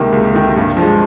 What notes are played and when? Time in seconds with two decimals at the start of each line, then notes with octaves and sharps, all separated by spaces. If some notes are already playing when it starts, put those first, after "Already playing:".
Already playing: C#2 C3 D#3 A#3
0.12 C#2
0.34 C3 D#3 A#3
0.56 G2
0.77 F3
0.82 G#3